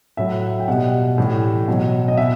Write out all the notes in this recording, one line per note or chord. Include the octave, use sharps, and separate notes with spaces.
A2 F#3 E5
G5
B2 G3 F#5
A2 E3 G3
B2 F#3
D#5
B2 E5